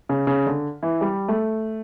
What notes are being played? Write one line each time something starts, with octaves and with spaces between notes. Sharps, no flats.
C#3
C#3
D3
E3
G3
A3